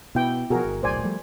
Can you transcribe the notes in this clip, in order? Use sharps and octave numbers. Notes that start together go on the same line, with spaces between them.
B2 B3 E4 G5
B2 F3 F#4 G#4 A#4
G1
D#1 B1 A2 C5 D5 G#5
F3 G3 A3